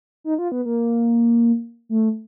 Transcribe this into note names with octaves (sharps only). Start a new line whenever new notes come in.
D#4
F4
B3
A#3
A3